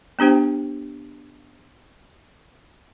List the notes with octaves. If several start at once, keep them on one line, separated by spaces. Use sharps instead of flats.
B3 D4 G4 C5 G5